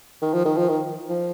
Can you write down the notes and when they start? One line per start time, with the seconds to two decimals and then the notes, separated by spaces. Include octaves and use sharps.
0.22 D#3
0.34 F3
0.45 D#3
0.57 F3
0.69 D#3
1.10 F3